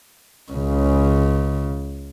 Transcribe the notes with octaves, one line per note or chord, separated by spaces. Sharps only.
C#2 C#3